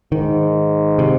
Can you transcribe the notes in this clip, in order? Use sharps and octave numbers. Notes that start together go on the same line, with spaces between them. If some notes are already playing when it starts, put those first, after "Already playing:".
G#2 D#3
C3